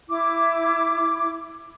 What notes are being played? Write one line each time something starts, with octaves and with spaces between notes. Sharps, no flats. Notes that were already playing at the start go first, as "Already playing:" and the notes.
E4 D6